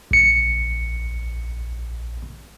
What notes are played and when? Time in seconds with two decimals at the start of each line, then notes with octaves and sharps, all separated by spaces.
0.11 A#1 C#7